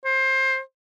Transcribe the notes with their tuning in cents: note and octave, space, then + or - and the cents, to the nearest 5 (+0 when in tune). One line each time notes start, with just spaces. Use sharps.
C5 +20